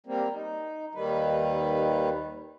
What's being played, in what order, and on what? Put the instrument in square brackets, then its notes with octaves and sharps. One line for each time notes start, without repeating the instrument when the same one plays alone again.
[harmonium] G3 A#3 C4
D#4
D#2 D#3 G3 B4